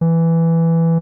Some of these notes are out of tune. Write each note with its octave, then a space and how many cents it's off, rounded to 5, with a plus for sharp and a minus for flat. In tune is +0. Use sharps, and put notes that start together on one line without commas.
E3 +5